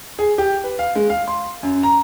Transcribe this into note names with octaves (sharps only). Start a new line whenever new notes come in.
G#4
G4
B4
F5
G#3
F5
C6
F#2
A#5